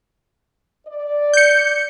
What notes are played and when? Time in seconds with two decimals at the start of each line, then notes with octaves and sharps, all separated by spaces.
0.87 D5
1.33 G6 C#7